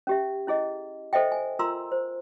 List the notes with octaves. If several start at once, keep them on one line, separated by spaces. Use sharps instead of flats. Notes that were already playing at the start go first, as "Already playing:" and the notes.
C#4 G4 E5
C#4 E4 G#4 D#5
A4 C5 D#5 E5 G5
G#5
F4 A#4 A#5 C6 E6
C5